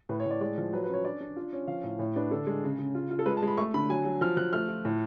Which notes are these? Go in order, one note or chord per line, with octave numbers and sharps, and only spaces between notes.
A2 B4
C#5
A2 D5
G#3 D5
F3
F#3 B4
B4
C#4 C#5
D4 D5
D4
F4
C#4
F3 F5
A2
A2 C#5
D4 B4
D3 A4
G#3
C#3
C#3
F4
F4
A4
G#3 B4
A5
G#3
B5
A3 C#6
D3 B5
F#3 G#5
F#3
F3 F6
F3 F#6
A3 F6
F4
A2